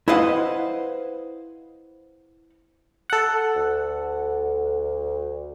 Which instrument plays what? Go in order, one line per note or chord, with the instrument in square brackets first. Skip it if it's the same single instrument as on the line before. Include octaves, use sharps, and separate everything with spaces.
[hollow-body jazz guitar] E4 B4 C5 D#5 F5 F#5
[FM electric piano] A4 F#5
[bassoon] D2